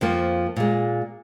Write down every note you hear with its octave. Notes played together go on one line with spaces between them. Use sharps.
F2 F3 A#3
A#2 G#3